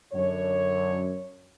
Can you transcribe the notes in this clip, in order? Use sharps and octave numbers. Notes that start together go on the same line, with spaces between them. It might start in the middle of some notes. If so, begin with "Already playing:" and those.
F#2 D3 C#5